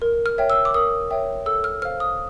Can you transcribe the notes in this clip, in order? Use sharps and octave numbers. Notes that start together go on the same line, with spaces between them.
A#4
F6
C#5 E5 G5
E6
D6
A#4 D#6
C#5 E5 G5
A4 E6
F6
C5 F5 F6
D#6